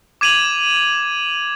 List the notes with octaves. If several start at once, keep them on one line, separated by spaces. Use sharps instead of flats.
D6 G#6 D#7 F7 F#7